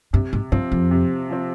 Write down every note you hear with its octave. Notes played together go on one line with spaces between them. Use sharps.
G2 C3
G#2
G2 F3 C4
F2
C3
F3 C4